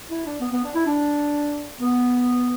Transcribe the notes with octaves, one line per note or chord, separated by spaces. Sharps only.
E4
D4
B3
B3
D4
E4
D4
B3